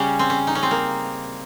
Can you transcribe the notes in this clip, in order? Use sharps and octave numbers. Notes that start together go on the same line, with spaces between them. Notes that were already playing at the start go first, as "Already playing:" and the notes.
Already playing: C#3 G3 C#4
C4
C#4
D#4
C#4
C4
A#3